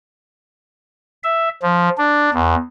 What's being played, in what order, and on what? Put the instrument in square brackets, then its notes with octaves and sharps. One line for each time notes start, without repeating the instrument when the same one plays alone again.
[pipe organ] E5
F3
D4
E2